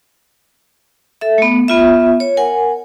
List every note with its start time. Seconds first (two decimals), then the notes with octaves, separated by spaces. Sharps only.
1.21 A4 E5
1.38 A3 B3
1.68 B3 F4 E5
2.20 C#5
2.37 A#4 F#5 G#5